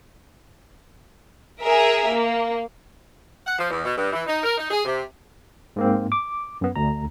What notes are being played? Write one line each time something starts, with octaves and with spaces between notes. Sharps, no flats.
G#4 A#4 E5
A#3
F#5
F3
E2
B2
G2
E3
D#4
A#4
D#4
G#4
C3
G#2 A#3 C4
D6
F#2 B3
D2 A#5